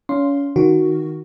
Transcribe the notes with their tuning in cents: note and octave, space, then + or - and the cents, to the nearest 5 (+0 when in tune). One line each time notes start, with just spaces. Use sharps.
C#4 +30 F5 +0 C6 +0
D#3 +0 F#4 +0 A#4 +10